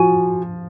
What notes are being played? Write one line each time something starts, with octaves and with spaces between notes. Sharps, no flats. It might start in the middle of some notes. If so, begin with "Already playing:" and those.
Already playing: F3 F#4 G#5